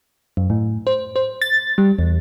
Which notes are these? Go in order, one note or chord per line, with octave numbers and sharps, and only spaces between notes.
F#2
A2
C5
C5
A6
G3
E2